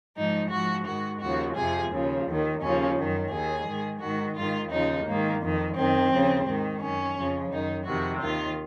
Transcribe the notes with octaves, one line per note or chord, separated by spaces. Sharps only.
G#2 F3 D#4
G#2 F3 F#4
G#2 D#3 F#4
D#2 C#3 F3 F#4
F2 C3 F3 G#4
D#2 C#3 F3
D#2 D#3
D#2 C#3 F3 C#4
F#2 D#3
D#2 D#3 G#4
G#2 D#3
G#2 D#3 F#4
G#2 D#3 F4
D#2 C#3 F3 D#4
G#2 D#3 A#3
F2 D#3
F#2 D#3 C4
D#2 C#3 F3
G#2 D#3
F#2 D#3 C#4
F2 C#3 F3
F#2 D#3 D#4
F2 C3 D#3 F#4
D#2 D#3 F4